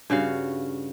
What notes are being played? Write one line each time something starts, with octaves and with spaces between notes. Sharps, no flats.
G2 C#3 F#4 F5